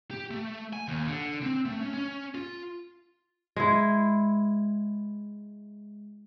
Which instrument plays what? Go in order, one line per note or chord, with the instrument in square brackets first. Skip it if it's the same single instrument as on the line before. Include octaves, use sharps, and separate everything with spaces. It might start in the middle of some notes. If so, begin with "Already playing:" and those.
[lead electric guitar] G4
A3
G#5
D#2
D3
C4
A3
C#4
C#4
F4
[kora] G#3 E4